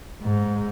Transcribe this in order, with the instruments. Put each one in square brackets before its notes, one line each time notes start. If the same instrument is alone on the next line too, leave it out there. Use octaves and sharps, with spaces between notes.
[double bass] G#2